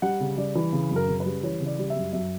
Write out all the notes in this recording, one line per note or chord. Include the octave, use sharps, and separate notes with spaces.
G3 F#5
C#3
G3 D5
E3
C#3
F#2
A#4
C#3
B4
G3
E3 C#5
C#3
D5
G3
E5
F#2
F#2 E5